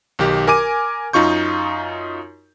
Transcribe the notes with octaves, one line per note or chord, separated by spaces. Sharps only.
B1 D#3 G4
A#4 G#5 D6 D#7
F#2 D#4 F4 C#6 G6